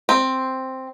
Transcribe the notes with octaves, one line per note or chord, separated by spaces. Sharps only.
C4